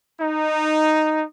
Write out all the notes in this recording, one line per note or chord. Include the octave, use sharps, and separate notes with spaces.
D#4